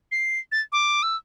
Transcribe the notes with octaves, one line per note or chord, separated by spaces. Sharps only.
C7
A6
D6
E6